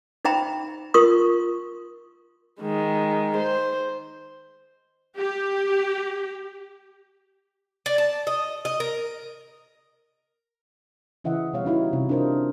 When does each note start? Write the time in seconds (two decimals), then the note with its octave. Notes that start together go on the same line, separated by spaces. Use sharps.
0.25 D#4 C5 E5 G5 A#5 B5
0.94 F4 A#4 C6 C#6 D#6
2.61 D#3 G#3
3.37 C5
5.17 G4
7.86 D5
7.98 A5
8.27 D#5
8.65 D#5
8.80 A#4
11.24 C#3 E3 D#5 E5 F#5
11.53 B2 G3 C#5 F5
11.65 C#4 D#4 E4 F#4
11.93 C3
12.09 D4 F4 A#4 C5 D#5